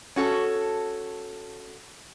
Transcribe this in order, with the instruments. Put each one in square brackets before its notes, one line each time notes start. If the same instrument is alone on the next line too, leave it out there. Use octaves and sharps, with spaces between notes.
[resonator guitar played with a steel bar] C#4 F#4 A4